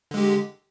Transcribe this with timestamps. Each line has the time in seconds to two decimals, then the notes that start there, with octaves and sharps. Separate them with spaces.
0.11 D3
0.14 G#3
0.17 G4